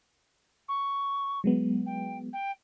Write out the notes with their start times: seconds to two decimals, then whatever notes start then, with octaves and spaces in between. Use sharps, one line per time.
0.68 C#6
1.44 F#3 G#3 B3
1.86 G5
2.33 G5